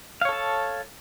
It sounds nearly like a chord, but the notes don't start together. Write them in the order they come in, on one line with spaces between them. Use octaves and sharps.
F5 C#5 A4 A5